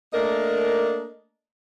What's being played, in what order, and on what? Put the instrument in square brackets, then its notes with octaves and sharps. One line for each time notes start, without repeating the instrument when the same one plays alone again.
[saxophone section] A3 A#3 D4 A#4 D#5